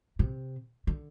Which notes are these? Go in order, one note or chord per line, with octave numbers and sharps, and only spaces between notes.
C3
D3